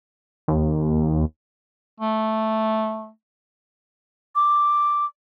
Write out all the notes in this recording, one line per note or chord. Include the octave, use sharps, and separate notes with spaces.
D#2
A3
D6